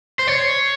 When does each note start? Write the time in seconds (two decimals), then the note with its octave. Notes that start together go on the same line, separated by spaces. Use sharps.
0.19 C5
0.27 C#5